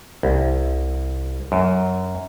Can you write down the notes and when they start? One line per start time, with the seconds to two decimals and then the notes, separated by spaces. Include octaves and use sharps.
0.23 C2
1.52 F#2